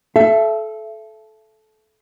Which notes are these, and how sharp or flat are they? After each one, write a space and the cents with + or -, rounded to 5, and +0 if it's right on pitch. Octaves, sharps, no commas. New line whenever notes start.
A4 -20 E5 +30